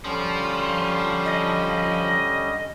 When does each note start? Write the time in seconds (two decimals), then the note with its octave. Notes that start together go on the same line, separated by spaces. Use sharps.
0.04 D3 F3 G3 C#4
1.26 D#5